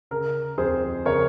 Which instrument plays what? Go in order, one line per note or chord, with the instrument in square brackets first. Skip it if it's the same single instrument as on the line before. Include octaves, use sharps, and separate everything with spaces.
[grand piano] C#3 A#4
F2 G#4 C5
C#3 A#4 C#5